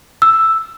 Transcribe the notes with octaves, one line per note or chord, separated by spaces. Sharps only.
E6